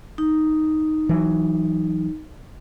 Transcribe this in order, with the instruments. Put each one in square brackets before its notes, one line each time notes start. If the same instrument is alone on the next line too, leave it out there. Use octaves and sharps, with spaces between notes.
[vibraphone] D#4
[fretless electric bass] E3 F#3